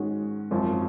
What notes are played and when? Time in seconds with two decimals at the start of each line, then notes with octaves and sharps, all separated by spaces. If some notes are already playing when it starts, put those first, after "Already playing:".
Already playing: G#2 D#3 G#3 C#4 F#4
0.51 G#1 F#2 F3 C4